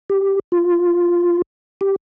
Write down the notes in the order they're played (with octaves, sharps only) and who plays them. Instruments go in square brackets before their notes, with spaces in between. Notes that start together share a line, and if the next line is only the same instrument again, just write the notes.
[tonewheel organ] G4
F4
G4